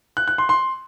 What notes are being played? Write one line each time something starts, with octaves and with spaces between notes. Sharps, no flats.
F#6
F#6
C6
C6